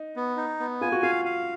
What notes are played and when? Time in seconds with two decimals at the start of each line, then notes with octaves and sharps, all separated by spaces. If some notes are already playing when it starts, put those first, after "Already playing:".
Already playing: D#4
0.16 B3
0.37 D#4
0.60 B3
0.81 F4 G#5
0.92 F#4
1.03 F4 F5
1.25 F5